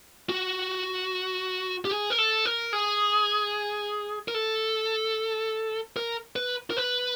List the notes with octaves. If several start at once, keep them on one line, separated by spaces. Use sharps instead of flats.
F#4
G4
G#4
A#4
A4
A#4
G#4
A#4
A4
A#4
B4
A#4
B4